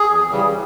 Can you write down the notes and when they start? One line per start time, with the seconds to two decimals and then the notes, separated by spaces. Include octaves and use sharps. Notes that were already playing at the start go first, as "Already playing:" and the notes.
Already playing: G#4
0.10 E2
0.31 C#3 E3 G3